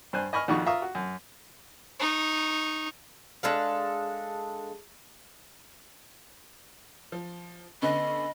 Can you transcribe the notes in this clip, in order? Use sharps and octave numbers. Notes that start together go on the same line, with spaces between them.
G2 C5 G#5 F#6
D#5 G#5 B5 C#6 D#6 F6
A#1 F2 D#3 F#4 C#6
F4 E5 F5 A#5 C#6 D#6
F#4
F#2
D#4 C#6
G#3 D4 A4 F5
F3
D3 B3 C#4 D#5 B5